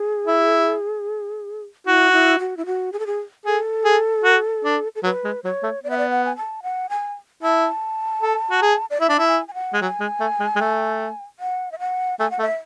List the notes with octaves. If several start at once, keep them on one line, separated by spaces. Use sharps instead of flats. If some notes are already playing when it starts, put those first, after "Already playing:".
Already playing: G#4
E4
E4 F#4
E4
F#4
E4
F#4
G#4
A4
G#4
G#4 A4
G#4
F#4
D4
A4
F#3 B4
G#3
F#3 C#5
A3
B3 D5
E5
D5
F#5
G#5
A5
F#5
G#5
E4 A5
A4
F#4
G#4
D5
E4 E5
D4
E4 A5
G#5
G#5
F#5
G#3
F#3 G#5
G#3
A3
G#3
G#3
A3
F#5
E5
F#5
A3 G#5
F#5
A3
E5